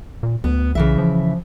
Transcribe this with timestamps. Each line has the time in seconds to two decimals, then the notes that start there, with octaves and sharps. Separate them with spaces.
0.23 A#2
0.44 D2 B3
0.75 B1 C#3 E3 E5
0.98 F3